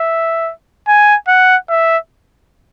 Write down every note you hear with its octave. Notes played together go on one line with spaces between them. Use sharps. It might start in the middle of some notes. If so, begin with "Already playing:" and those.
Already playing: E5
G#5
F#5
E5